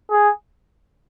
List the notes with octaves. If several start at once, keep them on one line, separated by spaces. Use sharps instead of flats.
G#4